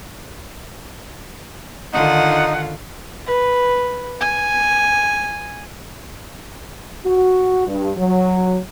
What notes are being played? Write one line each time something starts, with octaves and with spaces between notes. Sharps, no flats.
D3 D#3 D#4 F4 F#5
B4
G#5
F#4
G2
F#3